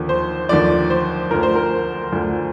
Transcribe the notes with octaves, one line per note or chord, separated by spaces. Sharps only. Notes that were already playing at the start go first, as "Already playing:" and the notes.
Already playing: D#2 D3 F3
C5
D#2 D3 F3 D5
C5
D2 D3 F3 A#4
C5
A#4
D2 D3 F3